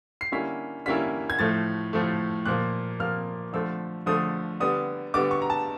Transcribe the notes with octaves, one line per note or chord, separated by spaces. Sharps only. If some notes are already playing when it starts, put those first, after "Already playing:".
C7
D3 G3 A#3 C#4 E4 B6
D3 G3 A#3 C#4 E4 B6
G#6
A2 F3 A3 A6
A2 F3 A3
A#2 F3 A#3 F#6
A#2 F3 A#3 F6
D3 F3 A3 E6
D3 F3 A3 D#6
D3 G3 B3 D#6
D3 G3 B3 D6
C#6
A#5
A5